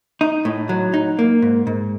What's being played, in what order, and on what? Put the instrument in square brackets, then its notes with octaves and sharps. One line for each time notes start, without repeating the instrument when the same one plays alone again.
[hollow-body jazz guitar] D#4
A2
F#3
D#4
A#3
G#2
G#2